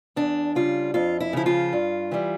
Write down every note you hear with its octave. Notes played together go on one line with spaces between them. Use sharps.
E2 D4
C#3 G3 F4
F2 F4
E4
C#3 F3 E4
F4
G2
E3 G3